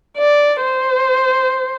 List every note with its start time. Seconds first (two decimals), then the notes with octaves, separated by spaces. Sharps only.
0.18 D5
0.63 C5